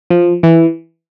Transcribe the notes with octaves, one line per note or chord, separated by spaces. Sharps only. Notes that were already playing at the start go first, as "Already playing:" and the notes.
F3
E3